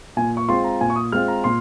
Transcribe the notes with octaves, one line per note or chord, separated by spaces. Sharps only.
A#2 G#5
C#6
G#3 C4 F4 C6
A#5
A#2 G#5
C#6
D#6
G#3 C4 F4 F6
A#5
A#2 C6